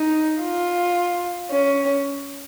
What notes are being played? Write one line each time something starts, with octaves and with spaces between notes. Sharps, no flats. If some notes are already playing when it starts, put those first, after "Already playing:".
Already playing: D#4
F4
C#4